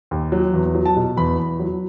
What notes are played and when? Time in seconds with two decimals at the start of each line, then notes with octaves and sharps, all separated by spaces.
0.11 D#2
0.32 F#3
0.54 E2
0.75 F#3
0.86 A5
0.97 B2
1.17 E2 B5
1.38 E2
1.60 F#3